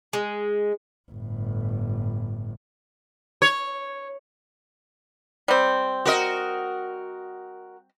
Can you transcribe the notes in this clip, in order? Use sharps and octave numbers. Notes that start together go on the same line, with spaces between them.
G#3
G1 A2
C#5
G3 C4
F#4 A#4 D#5